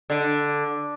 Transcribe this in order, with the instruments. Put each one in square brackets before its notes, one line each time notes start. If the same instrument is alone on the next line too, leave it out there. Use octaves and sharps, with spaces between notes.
[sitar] D3